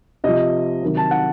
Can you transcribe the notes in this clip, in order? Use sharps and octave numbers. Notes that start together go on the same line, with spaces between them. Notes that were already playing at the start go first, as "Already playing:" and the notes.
C3 F3 D#5
C3 D#3 F#3
A5
F#5